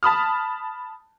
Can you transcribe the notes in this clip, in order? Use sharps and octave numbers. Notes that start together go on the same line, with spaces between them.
A5 B5 D#6 F6